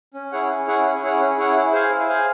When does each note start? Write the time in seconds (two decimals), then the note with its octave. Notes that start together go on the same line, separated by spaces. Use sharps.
0.14 C#4
0.32 E4 G#4 C#5 F#5
0.49 C#4
0.67 E4 G#4 C#5 F#5
0.84 C#4
1.02 E4 G#4 C#5 F#5
1.20 C#4
1.37 E4 G#4 C#5 F#5
1.56 E4
1.72 G#4 C5 F5 G#5
1.90 E4
2.08 G#4 C5 F5 G#5